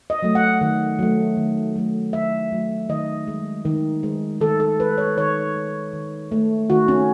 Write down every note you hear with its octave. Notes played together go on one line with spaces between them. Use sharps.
D#5
F#3 A3
F#5
D#3
F#3 A3
D#3
F#3 A3
D#3 E5
F#3 A3
D#3 D#5
G#3
D#3
G#3
D#3 A4
A4
G#3 B4
C#5
D#3 C#5
G#3
D#3
A3
D#3 F#4
C#4